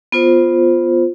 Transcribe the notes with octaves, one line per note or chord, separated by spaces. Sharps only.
B3 F4 C5